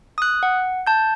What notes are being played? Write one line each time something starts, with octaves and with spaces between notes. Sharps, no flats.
D#6 F#6
F#5
A5 G6